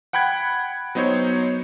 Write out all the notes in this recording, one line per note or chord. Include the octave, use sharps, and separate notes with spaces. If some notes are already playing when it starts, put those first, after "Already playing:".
F#5 G5 B5 F#6 G#6
F#3 B3 D#4 C5 C#5